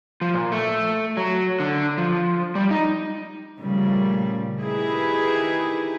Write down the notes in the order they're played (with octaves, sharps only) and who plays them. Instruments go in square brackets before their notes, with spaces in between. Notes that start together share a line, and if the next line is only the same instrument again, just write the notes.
[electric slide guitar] F3
A#2
A3
F#3
D3
F3
G3
D#4
[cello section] A#2 C#3 F3 G3 A3
D#3 D#4 E4 G4 G#4 B4